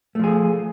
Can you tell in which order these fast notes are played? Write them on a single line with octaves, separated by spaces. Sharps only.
A3 F3 G#4